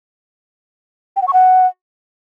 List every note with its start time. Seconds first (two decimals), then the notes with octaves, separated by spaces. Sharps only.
1.16 G5
1.22 F#5
1.28 C#6
1.33 F#5